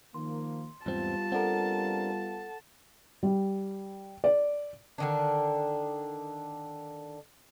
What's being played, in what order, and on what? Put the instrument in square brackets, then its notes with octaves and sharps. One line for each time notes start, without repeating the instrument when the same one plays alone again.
[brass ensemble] D#3 F3 A#3 [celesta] C6
[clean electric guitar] E2 G#2 C4 [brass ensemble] G3 B3 F4 [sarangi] A5
[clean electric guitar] C4 D4 A#4 [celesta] A4 F#5
[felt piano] G3
D5
[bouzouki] D3 D#3 D4